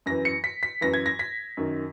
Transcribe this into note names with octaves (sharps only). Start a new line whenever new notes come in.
F#2 E3 A#6
C#7
B6
B6
F#2 E3 A#6
G#6
A#6
B6
F#2 D#3